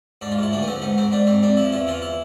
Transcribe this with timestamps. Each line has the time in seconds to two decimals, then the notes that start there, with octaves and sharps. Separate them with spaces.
0.21 G#2 D4
0.31 F4
0.38 G#2 E4
0.52 D2 D4
0.62 B3
0.67 F3 C4
0.82 G#2 B3
0.98 G#2 C4
1.12 G#2 D4
1.27 G#2 C4
1.42 F2 D4
1.57 F3 E4
1.72 E2 E4
1.87 E3 F4
2.02 E4